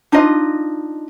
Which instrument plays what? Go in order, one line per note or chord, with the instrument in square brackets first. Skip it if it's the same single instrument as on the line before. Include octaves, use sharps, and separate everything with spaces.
[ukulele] D4 D#4 F4 D#5